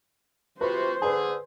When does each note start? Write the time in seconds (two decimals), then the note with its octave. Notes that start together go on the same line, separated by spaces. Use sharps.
0.61 C3 F4 F#4 B4 C5
1.02 D3 G#4 B4 G#5